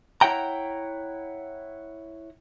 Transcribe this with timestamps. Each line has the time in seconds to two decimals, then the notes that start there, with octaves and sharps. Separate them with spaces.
0.21 E4 C#5 F#5 G5 A#5